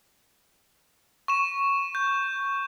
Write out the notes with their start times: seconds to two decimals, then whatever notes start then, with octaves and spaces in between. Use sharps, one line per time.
1.28 C#6 E7
1.95 G6